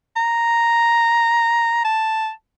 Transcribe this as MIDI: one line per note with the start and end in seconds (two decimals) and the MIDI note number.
0.16 1.83 82
1.85 2.30 81